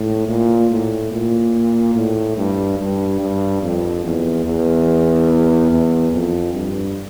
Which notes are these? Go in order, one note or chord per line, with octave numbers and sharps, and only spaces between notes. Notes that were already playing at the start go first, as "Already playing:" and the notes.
Already playing: A2
A#2
A2
A#2
A2
G2
G2
G2
F2
E2
E2
E2
F2
G2